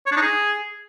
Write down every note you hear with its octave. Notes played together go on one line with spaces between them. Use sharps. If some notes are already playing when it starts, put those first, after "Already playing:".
C#5
D4
D#4
G#4